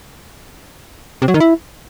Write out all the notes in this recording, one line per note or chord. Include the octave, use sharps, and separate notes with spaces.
C3
F#3
D#3
E4